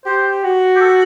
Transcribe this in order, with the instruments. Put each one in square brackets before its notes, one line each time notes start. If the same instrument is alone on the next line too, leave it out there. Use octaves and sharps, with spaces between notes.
[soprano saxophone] G4 [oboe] C5
[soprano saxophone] F#4
[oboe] G4
A4